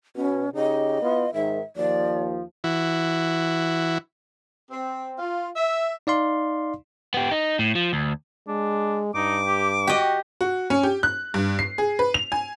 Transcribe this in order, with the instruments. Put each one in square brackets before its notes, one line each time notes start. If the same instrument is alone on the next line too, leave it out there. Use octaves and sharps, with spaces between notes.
[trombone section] B2 [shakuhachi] C#4
[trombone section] C#3 D#4 G4 [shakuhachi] D#5
[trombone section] B3 E4 F4
[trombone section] G#2 D#3 [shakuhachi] E5
[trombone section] D#2 F3 [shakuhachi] D5
[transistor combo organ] E3 E4 F#4
[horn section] C4
F4
E5
[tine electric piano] D#4 D5 F5 C6
[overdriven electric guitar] B3 G4
D#4
A2
F3
D2
[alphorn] G#3 [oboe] D4
[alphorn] G2 [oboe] D#4 [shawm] D6
[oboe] G4
[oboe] F#4 [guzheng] G4 D#5
[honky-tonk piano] F#4
C#4
G4
F#6
G2
C7
G#4
B4
F7
G#5